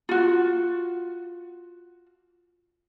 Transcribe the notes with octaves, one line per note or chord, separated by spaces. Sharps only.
F4 F#4